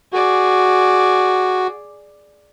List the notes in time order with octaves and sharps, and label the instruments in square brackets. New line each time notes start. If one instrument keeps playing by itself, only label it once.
[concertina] F#4 [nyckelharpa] G#4 D5